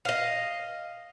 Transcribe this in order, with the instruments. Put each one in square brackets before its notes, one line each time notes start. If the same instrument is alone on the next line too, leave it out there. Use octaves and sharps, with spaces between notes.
[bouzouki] D#5 F5